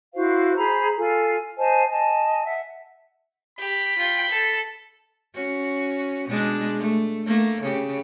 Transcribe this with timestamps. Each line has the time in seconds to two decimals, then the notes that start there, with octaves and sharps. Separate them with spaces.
0.15 E4 F#4 C5 F5
0.56 G#4 C5 A#5 B5
0.97 F4 A4 G#5
1.58 C5 D#5 G#5 A5
1.90 D#5 G#5 A5
2.45 E5 F#5
3.59 G4 B5
3.98 F4 G5
4.30 A4 A5
5.35 C#4 F#4
6.27 B2 G#3 D4
6.78 A3
7.26 A3 A#3
7.63 C#3 G4